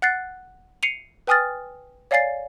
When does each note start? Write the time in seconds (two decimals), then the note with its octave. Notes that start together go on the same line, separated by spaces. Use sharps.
0.02 F#5 F#6 A6 C7
0.83 C7 C#7 D#7 F7
1.27 B4 G5 G#5 D#6 F6 A6
2.11 C#5 D5 F5 G#5 A6 C7